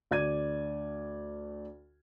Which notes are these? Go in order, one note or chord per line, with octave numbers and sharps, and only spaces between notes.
D2 D5 G#6 D#7